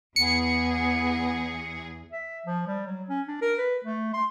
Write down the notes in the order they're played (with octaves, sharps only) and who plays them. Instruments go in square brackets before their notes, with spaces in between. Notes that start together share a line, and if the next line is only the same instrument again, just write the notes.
[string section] E2 G#4 [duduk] B3 [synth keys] C#7
[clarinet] E5
F3
G3
F#3
C#4
D4
A#4
B4
A3
C6